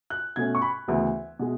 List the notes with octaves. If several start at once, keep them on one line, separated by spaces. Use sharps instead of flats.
F#6
B2 A3 C#4 G#6
C#6
B5
D2 C#3 E3 B3 E5
B2 G#3